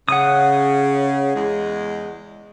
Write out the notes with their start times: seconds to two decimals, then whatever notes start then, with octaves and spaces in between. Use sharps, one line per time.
0.09 C#3 F#5 D#6
1.35 E2 G#3